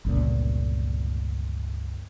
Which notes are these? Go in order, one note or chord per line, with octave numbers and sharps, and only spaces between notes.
G1 C#2 A#2